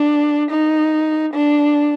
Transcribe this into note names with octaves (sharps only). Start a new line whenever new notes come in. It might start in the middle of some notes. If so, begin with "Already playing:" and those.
Already playing: D4
D#4
D4